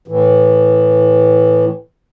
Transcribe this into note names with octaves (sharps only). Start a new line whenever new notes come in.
A2 E3